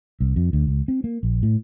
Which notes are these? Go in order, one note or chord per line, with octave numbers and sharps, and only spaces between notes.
C2
F2
D2
C#2
C4
A#3
A#1
A2